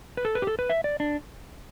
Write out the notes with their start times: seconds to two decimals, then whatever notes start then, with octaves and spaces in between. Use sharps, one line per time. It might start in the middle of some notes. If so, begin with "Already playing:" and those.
0.17 B4
0.25 A4
0.35 B4
0.42 G4
0.47 A4
0.59 B4
0.70 E5
0.84 D5
1.00 D4